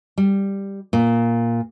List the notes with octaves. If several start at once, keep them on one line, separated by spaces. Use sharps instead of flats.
G3
A#2